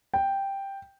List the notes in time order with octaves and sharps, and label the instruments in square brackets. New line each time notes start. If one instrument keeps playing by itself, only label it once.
[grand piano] G5